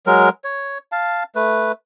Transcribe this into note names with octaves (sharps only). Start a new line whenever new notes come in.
F#3 G#3 A#4
C#5
F5 A5
A3 B4